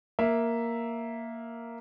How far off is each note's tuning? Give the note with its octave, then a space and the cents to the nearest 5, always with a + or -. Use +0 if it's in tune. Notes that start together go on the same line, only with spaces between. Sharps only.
A#3 +0 E5 +0